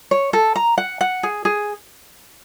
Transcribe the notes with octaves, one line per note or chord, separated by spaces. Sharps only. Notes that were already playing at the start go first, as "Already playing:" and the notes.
C#5
A4
A#5
F#5
F#5
G#4
G#4